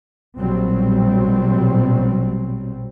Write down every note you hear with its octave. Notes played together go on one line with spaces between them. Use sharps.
A#1 B2 F#3 G3 C4